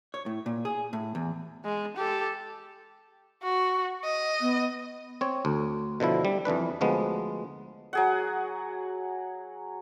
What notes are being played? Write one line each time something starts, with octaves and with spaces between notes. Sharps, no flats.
C#5
A2
A#2
G#4
A2
E2
G#3
G4 A4
F#4
D#5
B3
C4 C#5
D2
B2 D3 F3 E4
G3
F2 E3 D4 B4
D2 F3 G#3 B3
F#3 G#4 F#5